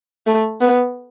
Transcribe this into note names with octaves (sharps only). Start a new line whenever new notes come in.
A3
B3